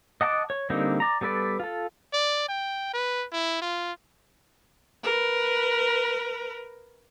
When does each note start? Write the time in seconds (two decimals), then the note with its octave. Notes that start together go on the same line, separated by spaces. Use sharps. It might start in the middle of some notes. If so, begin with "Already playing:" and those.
0.21 D#5 F#5 A5 D6
0.50 C#5
0.70 D3 G3 A#3 C4 D#4
1.00 D5 A#5
1.21 G3 B3 A4 B4 D5
1.60 F4 A4
2.14 D5
2.49 G5
2.94 B4
3.32 E4
3.62 F4
5.03 A#4 B4